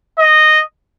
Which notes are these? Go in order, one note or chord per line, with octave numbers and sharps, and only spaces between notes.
D#5